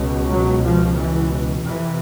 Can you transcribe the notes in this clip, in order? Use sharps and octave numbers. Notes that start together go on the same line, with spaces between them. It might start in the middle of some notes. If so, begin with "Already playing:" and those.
Already playing: C#2 B2
F#3
F3
E3
F2 C3 E3